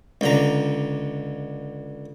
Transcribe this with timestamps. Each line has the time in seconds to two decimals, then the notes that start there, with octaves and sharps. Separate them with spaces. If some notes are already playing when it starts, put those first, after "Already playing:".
0.21 C#2 D3 A#5